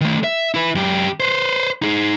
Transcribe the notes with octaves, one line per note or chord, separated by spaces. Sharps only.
D#3 A3
E5
E4 B4
F#2 G4
B4 C5
D#4 G#4